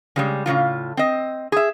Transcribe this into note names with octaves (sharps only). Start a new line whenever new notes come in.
C#3 G3 G#3
A2 C#3 F#3 F4
C4 D#5
G#4 E5